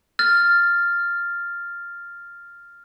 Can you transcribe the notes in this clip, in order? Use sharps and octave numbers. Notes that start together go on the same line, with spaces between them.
F6 A6